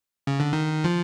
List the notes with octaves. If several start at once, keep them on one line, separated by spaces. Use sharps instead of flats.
C#3
D3
D#3
F3